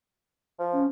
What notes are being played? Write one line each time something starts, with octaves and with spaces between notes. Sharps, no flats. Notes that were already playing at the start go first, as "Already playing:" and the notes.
F3
C#4